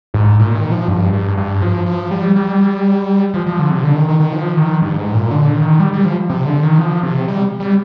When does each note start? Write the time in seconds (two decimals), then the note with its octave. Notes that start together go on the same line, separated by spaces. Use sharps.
0.14 G#2
0.39 A#2
0.55 D#3
0.71 F3
0.88 G2
1.13 G2
1.37 G2
1.62 F3
1.86 F3
2.11 G3
2.36 G3
3.34 F3
3.46 F3
3.59 D3
3.71 C3
3.84 D3
3.96 D#3
4.08 D#3
4.20 D#3
4.32 F3
4.57 D#3
4.82 G2
4.98 G#2
5.14 A#2
5.31 D3
5.56 D#3
5.80 G3
5.93 G3
6.05 F3
6.29 C3
6.46 D3
6.62 D#3
6.78 F3
7.03 C3
7.28 G3
7.60 G3